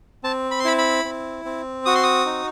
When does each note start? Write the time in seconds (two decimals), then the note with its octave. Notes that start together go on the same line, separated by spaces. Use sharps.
0.24 C4 A5
0.51 B5
0.60 C6
0.65 E4 B5
0.78 B5
1.04 C4
1.45 C4
1.85 F#4 D#6
1.95 C6
2.03 D#6
2.26 D#4